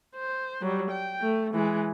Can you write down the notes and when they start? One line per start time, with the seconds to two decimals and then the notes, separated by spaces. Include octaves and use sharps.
0.16 C5
0.62 F#3 G3
0.91 G5
1.21 A3
1.55 E3 G#3